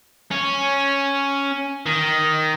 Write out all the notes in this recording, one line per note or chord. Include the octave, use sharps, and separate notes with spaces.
C#4
D#3